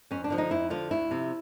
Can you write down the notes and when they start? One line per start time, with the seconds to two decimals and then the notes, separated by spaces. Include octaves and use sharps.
0.11 F2 C#4
0.24 D4
0.30 D3 F3
0.38 D#4
0.51 F2 E4
0.70 D3 F3 F4
0.91 D2 E4
1.11 C3 F3